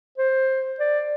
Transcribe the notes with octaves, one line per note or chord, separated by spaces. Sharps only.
C5
D5